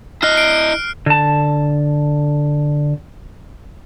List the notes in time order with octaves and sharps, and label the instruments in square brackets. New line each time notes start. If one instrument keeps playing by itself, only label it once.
[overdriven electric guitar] E4 D#5 [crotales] F6 F#6 C7
[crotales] C7 D7
[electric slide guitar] D3 A5